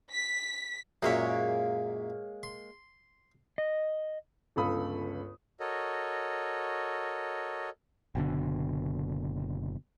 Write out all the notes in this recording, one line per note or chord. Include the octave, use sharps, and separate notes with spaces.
B6
F#2 A#2 G#3 A#3 C#5 E5
C6
D#5
G1 C#2 A4 F5 B5 D#6
F#4 A4 A#4 C#5 D#5
F#1 B2 D3